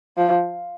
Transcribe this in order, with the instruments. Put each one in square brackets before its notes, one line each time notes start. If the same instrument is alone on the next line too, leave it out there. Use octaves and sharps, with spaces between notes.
[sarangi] F3